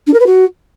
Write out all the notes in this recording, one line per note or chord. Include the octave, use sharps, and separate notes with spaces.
D4
A#4
B4
F#4